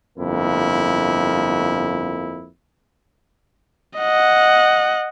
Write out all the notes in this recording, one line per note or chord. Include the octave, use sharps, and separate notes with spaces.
G1 F2 A#3 E4
D#5 F#5